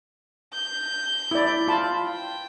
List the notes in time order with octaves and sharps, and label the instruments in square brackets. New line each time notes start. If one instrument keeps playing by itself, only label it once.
[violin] G6
[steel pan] E4 D5
F4 A5 B5
[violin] G5